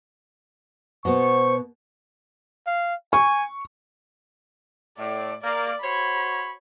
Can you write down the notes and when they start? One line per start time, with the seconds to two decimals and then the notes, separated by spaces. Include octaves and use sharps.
1.05 B2 B3 C5 C#6
2.66 F5
3.13 G#5 C#6
4.98 A2 D5
5.43 A#3 D5
5.83 F#4 C5 C#5 B5